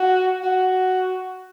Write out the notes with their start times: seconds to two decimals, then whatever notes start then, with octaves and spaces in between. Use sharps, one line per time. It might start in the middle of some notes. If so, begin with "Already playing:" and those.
Already playing: F#4
0.43 F#4